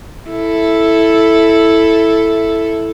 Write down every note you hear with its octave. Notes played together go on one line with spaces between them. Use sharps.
E4 A4